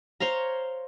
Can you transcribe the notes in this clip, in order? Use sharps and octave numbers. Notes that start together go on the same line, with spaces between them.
C5 C#5 F5 A#5